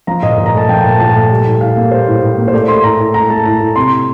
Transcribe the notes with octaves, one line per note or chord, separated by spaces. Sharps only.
F3 A#5
A#2 D#5
A#2
A#5
A3 A5
F3 G5
A#2 A5
A#2 A5
A3
G3
A2
A2 F5
A#3
G3 C5
A2
A2
A#3
C5
A3 D5
A3 C6
A2 A#5
A2
A3 A#5
A3 A5
A2 A#5
A2
C3 C6